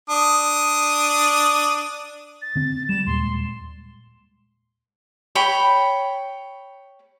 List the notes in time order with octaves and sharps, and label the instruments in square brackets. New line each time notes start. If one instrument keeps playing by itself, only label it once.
[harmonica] D4 D#6
[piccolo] A6
[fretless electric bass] D3 C4
[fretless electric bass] G3 [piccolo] E7
[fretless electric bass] D#2 A#2 G#3 [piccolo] C6
[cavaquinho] C#5 G5 B5